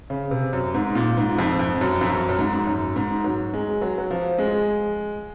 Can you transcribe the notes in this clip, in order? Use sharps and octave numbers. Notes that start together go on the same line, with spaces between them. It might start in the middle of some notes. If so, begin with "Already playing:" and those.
C#3
C3
F#2
G#2
A#2
G#2
F2
F2
F#2
F2
F#2
F#2
G#2
F#2
G#2
F#3
G#3
F#3
F#3
F3
G#3